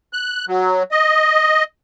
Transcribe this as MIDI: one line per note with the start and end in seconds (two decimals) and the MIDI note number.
0.13 0.45 90
0.48 0.83 54
0.91 1.64 75